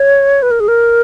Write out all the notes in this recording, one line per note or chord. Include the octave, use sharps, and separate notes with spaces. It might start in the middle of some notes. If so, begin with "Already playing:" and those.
Already playing: C#5
B4
A#4
G#4
A#4